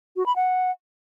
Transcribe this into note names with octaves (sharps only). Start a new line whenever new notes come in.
F#4
B5
F#5